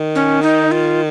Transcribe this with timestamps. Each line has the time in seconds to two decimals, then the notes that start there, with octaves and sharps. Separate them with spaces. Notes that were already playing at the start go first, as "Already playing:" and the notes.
Already playing: D#3
0.15 C#4
0.42 D#4
0.71 F4